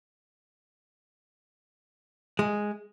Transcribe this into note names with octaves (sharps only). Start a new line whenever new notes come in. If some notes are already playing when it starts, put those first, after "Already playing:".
G#3